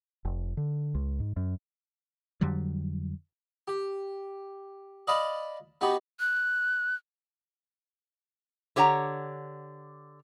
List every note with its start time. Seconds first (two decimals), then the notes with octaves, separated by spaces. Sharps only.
0.25 F1
0.57 D3
0.95 C#2
1.20 G#2
1.36 F#2
2.41 F2 D3 F#3 G3
3.68 G4
5.07 D5 D#5 F5 A5 B5
5.81 B3 D#4 F#4 G4
6.20 F#6
8.76 D3 G4 C#5 F#5 A5 A#5